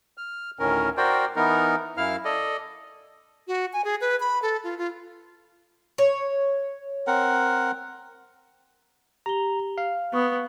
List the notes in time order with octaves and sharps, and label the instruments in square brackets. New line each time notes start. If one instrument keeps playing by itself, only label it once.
[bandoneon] F6
D2 A2 D#3 C#4 A#4
F#4 A#4 C5 D5 G5
E3 B3 D#4 A#4
F#2 E4 F5 F6
A4 D5 D#5
[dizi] F#4
G#5
G#4
B4
B5
A4
F4
F4
[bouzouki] C#5
[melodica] C4 A#4 F#5
[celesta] G4 F7 G7 [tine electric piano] A#5
[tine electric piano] F5
[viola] B3 [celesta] C#6 D#6